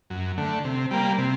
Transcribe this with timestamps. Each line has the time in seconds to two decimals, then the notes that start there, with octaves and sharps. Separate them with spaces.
0.10 F#2
0.38 D3 A3
0.65 C3
0.91 G3 A#3
1.18 C3